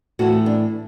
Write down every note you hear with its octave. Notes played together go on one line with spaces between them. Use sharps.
A2 E3 A3 F#4
D4